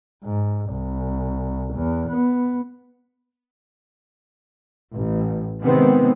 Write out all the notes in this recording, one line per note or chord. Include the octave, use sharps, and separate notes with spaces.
G#2
C2
E2
B3
A1
C3 D#3 G#3 B3 C4